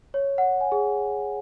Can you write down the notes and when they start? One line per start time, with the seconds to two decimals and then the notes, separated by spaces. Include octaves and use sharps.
0.14 C#5
0.38 F#5
0.61 G#5
0.72 G#4